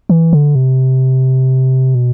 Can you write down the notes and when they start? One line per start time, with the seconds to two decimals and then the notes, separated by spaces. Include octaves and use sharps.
0.09 E3
0.33 D3
0.55 C3
1.95 B2